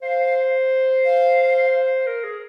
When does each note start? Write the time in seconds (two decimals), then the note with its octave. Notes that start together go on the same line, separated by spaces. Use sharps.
0.02 C5 F5
1.04 F5
2.06 A#4
2.24 G#4